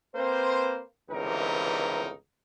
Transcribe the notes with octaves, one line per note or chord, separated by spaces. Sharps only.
A#3 C4 B4 C5
G1 C#2 C3 E3 D#4 A#4